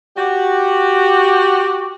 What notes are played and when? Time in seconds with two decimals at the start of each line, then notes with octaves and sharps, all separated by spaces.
0.17 F#4 G4